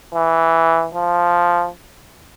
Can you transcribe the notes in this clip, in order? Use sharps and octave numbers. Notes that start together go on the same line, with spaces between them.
E3
F3